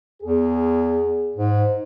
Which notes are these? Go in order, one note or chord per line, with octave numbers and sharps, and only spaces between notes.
E2 G#4
G#2